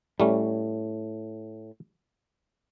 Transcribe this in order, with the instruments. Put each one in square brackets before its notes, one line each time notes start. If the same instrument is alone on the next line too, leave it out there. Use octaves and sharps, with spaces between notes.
[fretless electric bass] A2 [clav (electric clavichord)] G3 A3 C#4